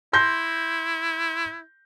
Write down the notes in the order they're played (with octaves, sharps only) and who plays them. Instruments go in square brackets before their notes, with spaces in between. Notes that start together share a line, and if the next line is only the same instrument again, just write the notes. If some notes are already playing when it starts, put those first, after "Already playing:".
[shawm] E4 [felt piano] C6 G6 A#6